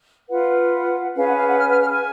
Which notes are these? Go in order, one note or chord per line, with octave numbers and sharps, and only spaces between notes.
F4 B4 F#5
C#4 G#4 B4 F5
F#5
F5
F#5
F6
F6
F6
A5
G#5